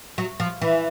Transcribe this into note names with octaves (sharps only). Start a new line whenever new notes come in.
F#3
F3
E3